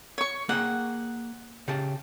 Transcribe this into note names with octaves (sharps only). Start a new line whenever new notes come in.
C#5 C#6
A#3 G#4 F#5 G5
C#3 G4 A5